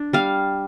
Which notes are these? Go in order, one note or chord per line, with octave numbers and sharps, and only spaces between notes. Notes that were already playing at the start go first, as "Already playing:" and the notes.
Already playing: D4
G3 F5